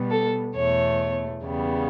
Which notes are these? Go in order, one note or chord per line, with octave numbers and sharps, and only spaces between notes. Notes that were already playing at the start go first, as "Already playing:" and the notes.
Already playing: B2 G3 B3
A4
E2 B2 A3 C#5
E2 C#3 G3 B3